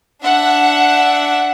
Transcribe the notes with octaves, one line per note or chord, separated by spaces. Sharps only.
D4 E5 F#5